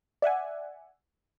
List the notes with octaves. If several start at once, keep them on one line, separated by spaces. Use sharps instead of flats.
D5 E5 F#5 G#5